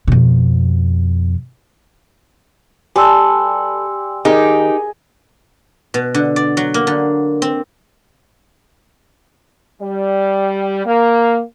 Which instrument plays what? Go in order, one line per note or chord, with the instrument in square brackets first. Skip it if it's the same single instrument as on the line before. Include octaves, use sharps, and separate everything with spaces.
[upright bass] F2 B2
[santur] G3 [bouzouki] A4 B4 [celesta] G#5 C6 E6
[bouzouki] D#3 [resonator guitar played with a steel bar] D#4 G4 [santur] G#4 D#5 [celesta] A#4
[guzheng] B2
D3
D5
F#3
A#3
D3
C4
[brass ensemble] G3
A#3